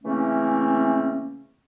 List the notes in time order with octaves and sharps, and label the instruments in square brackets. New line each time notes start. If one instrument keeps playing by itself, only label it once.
[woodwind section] C#3 E3 A3 A#3 C4 C#4